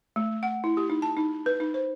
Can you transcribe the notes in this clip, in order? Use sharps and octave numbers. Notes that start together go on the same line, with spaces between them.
A3
F#5
E4
G4
D#4
A5
D#4
B4
D#4
C5